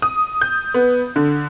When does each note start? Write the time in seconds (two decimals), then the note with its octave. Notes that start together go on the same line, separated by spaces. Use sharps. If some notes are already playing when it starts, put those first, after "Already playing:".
0.02 D#6
0.41 G6
0.74 B3
1.16 D3